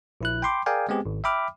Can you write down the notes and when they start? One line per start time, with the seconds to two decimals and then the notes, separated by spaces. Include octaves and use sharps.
0.21 A#1 E4 F#6
0.42 G5 B5 C6 D6
0.66 G#4 A#4 D5 F5 G5 G#5
0.89 G#3 B3 C4 G4 G#4
1.06 G#1
1.24 E5 G5 B5 D6 F6